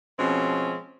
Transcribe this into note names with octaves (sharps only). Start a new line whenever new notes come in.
B2 F3 G#3 C4 C#4